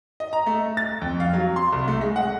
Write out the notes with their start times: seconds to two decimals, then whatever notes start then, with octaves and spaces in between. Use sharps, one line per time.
0.20 D#5
0.33 A#5
0.47 A3
0.77 A6
1.01 F2
1.20 F5
1.33 F#3
1.56 C6
1.73 C2
1.88 A3
2.01 G#3
2.16 F#5